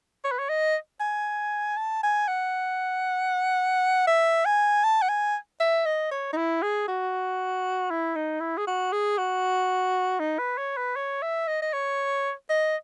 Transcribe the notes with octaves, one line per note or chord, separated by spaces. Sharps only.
C#5
B4
C#5
D#5
G#5
A5
G#5
F#5
E5
G#5
A5
F#5
G#5
E5
D#5
C#5
D#4
E4
G#4
F#4
E4
D#4
E4
G#4
F#4
G#4
F#4
D#4
B4
C#5
B4
C#5
E5
D#5
D#5
C#5
D#5